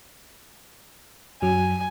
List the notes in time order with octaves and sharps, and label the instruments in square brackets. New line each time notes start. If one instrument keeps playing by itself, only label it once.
[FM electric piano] F#2 F#3 [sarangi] G#5